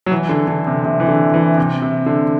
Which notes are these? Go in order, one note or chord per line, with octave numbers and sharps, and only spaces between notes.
F#3
E3
D3
D3
C3
C3
E3
D3
E3
C3
C3
D3